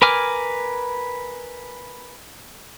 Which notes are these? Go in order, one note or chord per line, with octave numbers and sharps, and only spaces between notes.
A#4 B4 G#5 D6 F6